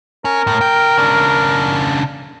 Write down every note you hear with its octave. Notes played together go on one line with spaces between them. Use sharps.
C#4 A#4
A2
C#3 G5
C#3 D4